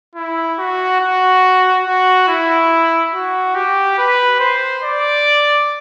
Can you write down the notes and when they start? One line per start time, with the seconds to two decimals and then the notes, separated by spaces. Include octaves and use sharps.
0.15 E4
0.59 F#4
1.00 F#4
1.85 F#4
2.28 E4
3.13 F#4
3.55 G4
3.98 B4
4.40 C5
4.83 D5